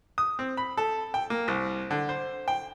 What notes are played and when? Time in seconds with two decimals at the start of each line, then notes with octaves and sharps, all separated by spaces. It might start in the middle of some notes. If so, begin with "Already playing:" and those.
0.18 D#6
0.39 C4
0.57 B5
0.77 A4
1.14 G5
1.30 A#3
1.48 C2
1.91 D3
2.09 C5
2.48 G5